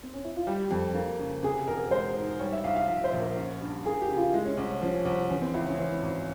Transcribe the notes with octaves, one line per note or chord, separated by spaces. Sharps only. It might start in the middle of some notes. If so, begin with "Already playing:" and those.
C4
C#4
E4
F4
G3 G4
F2
A#3
C#3
C3 G#4
E1 A#4
G#3 C5
G#2
G3 C#5
E5
C2 F5
F5
F3 E5
C5
A#1
A#4
C#4
G2
A#3 G#4
G4
C#3
F4
G#3 E4
C#4
C2 C#4
F3 C#4
C2
E3 C#4
C4
C#2 E4
C#4
E3 C4
G#1